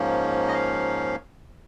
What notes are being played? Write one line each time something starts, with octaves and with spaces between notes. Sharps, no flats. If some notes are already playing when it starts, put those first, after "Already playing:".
Already playing: G#2 F3 A#3 C#4
D#5
F5